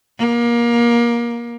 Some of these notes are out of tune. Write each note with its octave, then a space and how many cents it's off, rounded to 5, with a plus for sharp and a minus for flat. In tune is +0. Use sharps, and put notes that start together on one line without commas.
A#3 +25